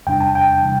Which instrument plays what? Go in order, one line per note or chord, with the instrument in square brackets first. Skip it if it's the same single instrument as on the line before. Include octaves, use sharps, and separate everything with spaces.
[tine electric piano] E2 C3 G3 D4 G5
A5
G5
C3 E3 G3